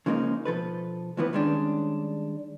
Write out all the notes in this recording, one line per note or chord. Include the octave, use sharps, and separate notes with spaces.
C#3 F3 G#3 A#3 C4 D#4
B2 F3 A4 B4
C#2 A2 E3 F3 B3 B4
D#3 G3 G#3 C#4 D4